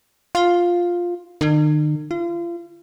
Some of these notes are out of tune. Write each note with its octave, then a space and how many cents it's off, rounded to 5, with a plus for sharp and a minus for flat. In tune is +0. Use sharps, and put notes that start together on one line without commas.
F4 +5
D#3 -45
F4 -35